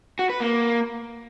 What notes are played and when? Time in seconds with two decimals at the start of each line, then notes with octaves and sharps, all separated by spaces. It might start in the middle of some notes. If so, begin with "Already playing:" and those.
0.19 F#4
0.30 B4
0.40 A#3